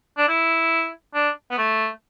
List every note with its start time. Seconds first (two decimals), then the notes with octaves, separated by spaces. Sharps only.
0.17 D4
0.28 E4
1.14 D4
1.51 B3
1.58 A3